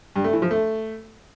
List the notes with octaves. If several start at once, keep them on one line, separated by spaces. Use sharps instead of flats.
G2
A3
E3
F3
A3